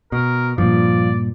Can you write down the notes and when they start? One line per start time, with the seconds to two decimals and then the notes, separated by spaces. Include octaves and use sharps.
0.12 B2 A#4
0.58 G2 A#2 F3 D5